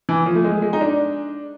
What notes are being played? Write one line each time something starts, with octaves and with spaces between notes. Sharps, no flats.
E3
F3
A3
G#3
G#3
D#4
D4